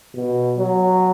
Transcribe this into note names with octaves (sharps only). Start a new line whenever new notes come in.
B2
F#3